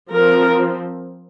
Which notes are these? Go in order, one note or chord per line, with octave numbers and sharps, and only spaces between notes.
F3 C4 A#4